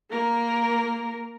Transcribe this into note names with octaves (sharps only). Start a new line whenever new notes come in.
A#3 A#4